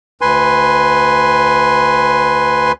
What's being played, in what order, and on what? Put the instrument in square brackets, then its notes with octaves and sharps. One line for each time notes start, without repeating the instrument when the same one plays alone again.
[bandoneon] D2 B4 G#5 C6